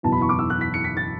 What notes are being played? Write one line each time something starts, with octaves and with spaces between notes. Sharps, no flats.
F#1 E2 B2 A5
B5
C#6
D6
E6
F#6
B6
C#7
B6
A6